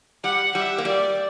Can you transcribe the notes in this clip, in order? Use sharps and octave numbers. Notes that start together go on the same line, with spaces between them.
G3 F#5
G3 E5
A#3
G3 D5